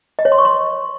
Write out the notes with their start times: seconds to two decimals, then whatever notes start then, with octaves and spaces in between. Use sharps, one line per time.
0.19 D#5
0.25 C#5
0.32 C6
0.38 C#6
0.45 C6